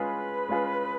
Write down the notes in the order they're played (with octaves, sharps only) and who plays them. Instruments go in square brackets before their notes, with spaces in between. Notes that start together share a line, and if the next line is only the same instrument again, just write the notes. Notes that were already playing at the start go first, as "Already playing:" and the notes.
Already playing: [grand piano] G#3 C#4 F4 G#4 [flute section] B4
[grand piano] G#3 C#4 F4 G#4